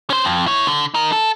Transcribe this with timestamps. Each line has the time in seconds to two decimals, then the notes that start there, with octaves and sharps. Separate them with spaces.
0.10 C#4 C5
0.24 F2
0.46 E4 C#5
0.67 D3
0.94 D#4 A#4
1.13 A4